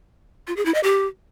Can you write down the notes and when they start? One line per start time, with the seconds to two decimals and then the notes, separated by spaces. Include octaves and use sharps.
0.47 F4
0.56 G#4
0.65 E4
0.74 D#5
0.83 G4